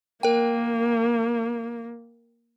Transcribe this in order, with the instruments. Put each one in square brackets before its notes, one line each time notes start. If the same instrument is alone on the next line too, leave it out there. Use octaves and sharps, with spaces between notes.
[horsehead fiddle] A#3 [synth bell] A#4 G5